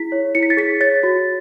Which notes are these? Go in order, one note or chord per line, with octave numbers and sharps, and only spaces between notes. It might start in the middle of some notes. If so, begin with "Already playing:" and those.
Already playing: E4 G#4 B6
C#5
E4 C#7
B6
A6
G#4 B6
C#5 A6
F#4